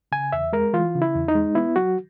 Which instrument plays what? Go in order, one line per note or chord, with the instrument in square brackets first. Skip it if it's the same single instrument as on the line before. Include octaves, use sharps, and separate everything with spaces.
[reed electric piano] C#3 G#5
E2 E5
G#3 A#4
E3 F4
C#3
E4
E2
D#4
G#3
B3 E4
F#3 F#4